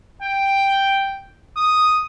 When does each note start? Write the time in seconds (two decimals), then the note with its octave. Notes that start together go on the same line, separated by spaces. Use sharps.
0.22 G5
1.57 D#6